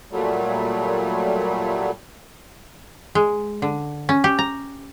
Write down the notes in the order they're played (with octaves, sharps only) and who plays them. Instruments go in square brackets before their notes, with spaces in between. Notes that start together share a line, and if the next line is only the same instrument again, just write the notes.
[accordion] A#2 F#3 G3 A3
[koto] G#3
D3
C#4
G4
A#5